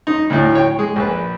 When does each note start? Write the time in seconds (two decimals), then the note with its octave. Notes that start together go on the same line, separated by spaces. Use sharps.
0.07 D#4
0.30 D2 A2
0.55 C#5 G5
0.79 G#3
0.96 A#1 B4